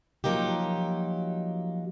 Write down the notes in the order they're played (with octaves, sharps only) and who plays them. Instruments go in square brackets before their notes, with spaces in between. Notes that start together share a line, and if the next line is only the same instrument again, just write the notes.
[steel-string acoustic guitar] F3 F#3 A#3 D#4 G4